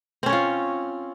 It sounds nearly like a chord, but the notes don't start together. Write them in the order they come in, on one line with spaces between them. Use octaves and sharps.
C4 C#4 C#5 F4